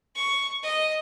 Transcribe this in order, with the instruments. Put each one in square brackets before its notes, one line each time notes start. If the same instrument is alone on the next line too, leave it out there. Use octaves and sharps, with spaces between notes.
[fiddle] C#6
D#5